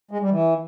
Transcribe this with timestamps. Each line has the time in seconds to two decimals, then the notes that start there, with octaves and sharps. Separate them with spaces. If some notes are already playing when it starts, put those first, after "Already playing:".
0.11 G#3
0.21 G3
0.30 E3